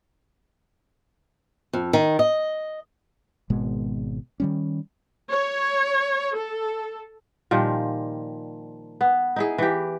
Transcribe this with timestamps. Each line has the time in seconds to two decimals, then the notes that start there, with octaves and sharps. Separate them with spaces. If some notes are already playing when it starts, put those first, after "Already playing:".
1.73 F2
1.93 D#3
2.19 D#5
3.50 G#1 B2 G#3 B3
4.40 D#3 G3 C#4
5.31 C#5
6.36 A4
7.51 A#2 D#3 F3 G3
9.01 B3
9.36 D#4 E4 G#4
9.58 E3 G4